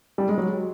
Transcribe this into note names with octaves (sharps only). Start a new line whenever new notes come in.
G3
G#3
F#3